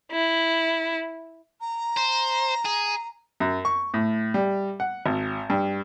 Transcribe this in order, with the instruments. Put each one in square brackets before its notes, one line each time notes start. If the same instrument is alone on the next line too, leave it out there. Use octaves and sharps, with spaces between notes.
[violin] E4
[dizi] A#5
[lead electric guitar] C5
G#4
[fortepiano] F#2
C#6
A2
G3
F#5
G#1
G2